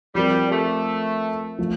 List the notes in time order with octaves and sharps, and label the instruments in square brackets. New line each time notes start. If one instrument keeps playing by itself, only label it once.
[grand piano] F3 C4 G4 A#4 [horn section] G3
[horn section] A3
[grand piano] F3 A3